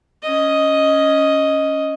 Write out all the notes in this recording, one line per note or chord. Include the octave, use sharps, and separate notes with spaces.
C#4 D#5